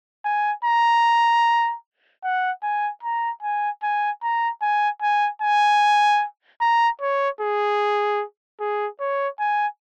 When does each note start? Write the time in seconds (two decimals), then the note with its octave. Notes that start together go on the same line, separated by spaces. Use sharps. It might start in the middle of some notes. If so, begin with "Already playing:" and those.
0.25 G#5
0.64 A#5
2.24 F#5
2.63 G#5
3.03 A#5
3.42 G#5
3.83 G#5
4.22 A#5
4.62 G#5
5.02 G#5
5.42 G#5
6.61 A#5
7.01 C#5
7.41 G#4
8.60 G#4
9.00 C#5
9.39 G#5